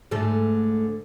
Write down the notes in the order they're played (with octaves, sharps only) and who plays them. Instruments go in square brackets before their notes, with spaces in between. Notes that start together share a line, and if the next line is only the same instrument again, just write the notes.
[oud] G#2 D3 A3